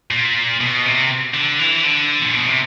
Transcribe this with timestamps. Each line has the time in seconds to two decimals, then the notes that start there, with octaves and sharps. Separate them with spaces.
0.11 A#2
0.61 B2
0.86 C3
1.34 D3
1.60 E3
1.84 D3
2.21 A#2
2.34 B2
2.46 C3